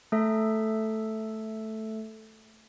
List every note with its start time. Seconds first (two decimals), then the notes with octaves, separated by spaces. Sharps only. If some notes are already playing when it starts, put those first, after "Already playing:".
0.12 A3 A4 E5